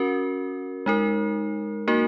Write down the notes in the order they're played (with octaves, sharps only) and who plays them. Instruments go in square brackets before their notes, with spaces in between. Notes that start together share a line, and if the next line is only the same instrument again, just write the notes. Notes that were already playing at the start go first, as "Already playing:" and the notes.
Already playing: [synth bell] C#4 F#4 A#4
G#3 D#4 A#4
A#3 D#4 F#4 A#4